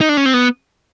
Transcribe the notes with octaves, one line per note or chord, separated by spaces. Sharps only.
D#4
D4
C#4
C4
B3